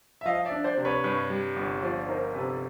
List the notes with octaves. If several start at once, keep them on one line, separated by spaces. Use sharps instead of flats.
E5
F3 D#5 F5
D5 E5
D4
C5 D5
C3
B4 C#5
G2 B4 C#5
G3
G1
F3 C5 D5
D#4 A#4 C5
C3 A4 B4